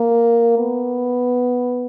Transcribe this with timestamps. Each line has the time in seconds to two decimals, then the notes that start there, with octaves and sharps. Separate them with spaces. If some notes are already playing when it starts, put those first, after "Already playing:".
Already playing: A#3
0.58 B3